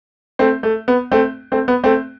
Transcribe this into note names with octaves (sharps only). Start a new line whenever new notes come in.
A3 C4
A3
B3
A3 C4
A3 C4
B3
A3 C4